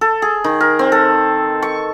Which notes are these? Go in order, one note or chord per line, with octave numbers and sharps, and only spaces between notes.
A4
G#4
D#3
A#4
C4
A4
C#6